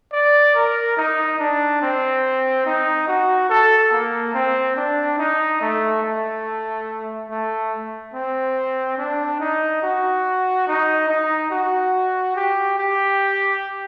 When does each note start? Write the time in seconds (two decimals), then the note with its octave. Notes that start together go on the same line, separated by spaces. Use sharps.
0.13 D5
0.55 A#4
0.97 D#4
1.39 D4
1.82 C4
2.66 D#4
3.07 F#4
3.49 A4
3.92 A#3
4.34 C4
4.76 D4
5.18 D#4
5.61 A3
6.02 A3
7.29 A3
8.14 C4
8.98 D4
9.40 D#4
9.82 F#4
10.67 D#4
11.08 D#4
11.50 F#4
12.35 G4
12.78 G4